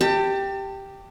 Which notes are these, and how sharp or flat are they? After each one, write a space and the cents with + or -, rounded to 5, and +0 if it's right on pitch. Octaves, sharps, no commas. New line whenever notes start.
G4 +0 A5 +35